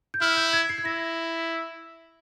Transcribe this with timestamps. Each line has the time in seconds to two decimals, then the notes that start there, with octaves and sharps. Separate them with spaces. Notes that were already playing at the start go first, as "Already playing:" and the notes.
0.14 G6
0.21 E4 F6
0.37 G6
0.53 G#6
0.69 C7
0.78 G#6
0.84 E4 A#6